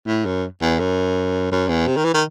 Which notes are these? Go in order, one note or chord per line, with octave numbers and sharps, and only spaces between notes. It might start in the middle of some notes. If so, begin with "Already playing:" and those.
A2
F#2
E2
F#2
F#2
E2
C3
D#3
E3
D#3